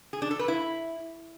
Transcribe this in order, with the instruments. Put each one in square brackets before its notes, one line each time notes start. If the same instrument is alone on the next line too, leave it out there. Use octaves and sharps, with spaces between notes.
[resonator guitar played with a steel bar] G#4
D4
A4
B4
E4